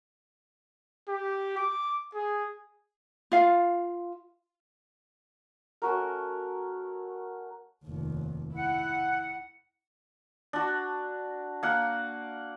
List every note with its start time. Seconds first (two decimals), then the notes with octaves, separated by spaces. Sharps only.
1.09 G4
1.57 D6
2.14 G#4
3.32 F4 F5
5.82 A3 C#4 F#4 A#4
7.85 F1 D#2
8.53 E4 F#5
10.53 D4 F#4
11.63 A#3 F#5